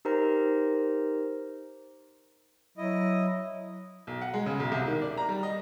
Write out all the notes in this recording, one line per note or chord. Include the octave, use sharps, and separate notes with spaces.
D#4 G4 A#4 C5 A#5
F#3 E4 D#5
B1
F#5
G#3
C#3
B1
C2
D#3
D5
A#5
G3
D#5